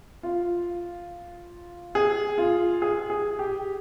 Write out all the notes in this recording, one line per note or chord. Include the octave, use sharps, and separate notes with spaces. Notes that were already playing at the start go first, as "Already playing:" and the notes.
F4
G#4
F4
G#4
G#4
G4